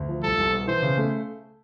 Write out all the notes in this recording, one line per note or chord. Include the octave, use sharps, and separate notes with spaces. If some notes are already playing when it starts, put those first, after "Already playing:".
Already playing: D2
F3
C2 A4
C2
B2
E3 C5
C#3
A3